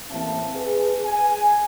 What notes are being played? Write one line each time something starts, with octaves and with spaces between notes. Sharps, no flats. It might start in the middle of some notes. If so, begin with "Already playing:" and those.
A1 E3 A#3 C4 E5 A5
G#4 B4
G#5